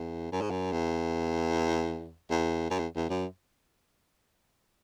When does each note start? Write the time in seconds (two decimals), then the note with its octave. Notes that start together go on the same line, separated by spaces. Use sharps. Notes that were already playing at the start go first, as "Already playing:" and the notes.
Already playing: E2
0.32 F#2
0.41 G#2
0.50 F#2
0.72 E2
2.30 E2
2.70 F#2
2.79 E2
2.96 E2
3.10 F#2